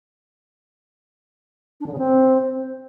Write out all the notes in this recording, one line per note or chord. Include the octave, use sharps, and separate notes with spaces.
D4
D3
C#3
C4